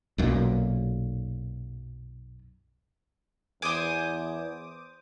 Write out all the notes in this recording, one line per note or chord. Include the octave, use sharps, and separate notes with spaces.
B1 F#2 A#2
E2 C5 G#5 D6 D#6 D#7